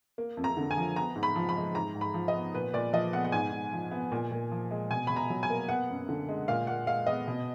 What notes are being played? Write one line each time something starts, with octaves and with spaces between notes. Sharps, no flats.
A#3
F2
A#5
D3
G#5
F3
B3 A#5
G#2
B5
F3
B5
G#3
G#2 A#5
G#2
B5
F3
D#5
B3
A#2 B4
A#2 D5
F3 D#5
B3 F#5
F#5
G#2 G#5
G#2
F3
B3
A#2
A#2
F3
G#3
B2 G#5
B2 B5
A#5
F#3
G#5
A#3
B3 F#5
F#2
D3
G#3
A#2 F5
A#2 F#5
G#3 F5
B3 D#5
B2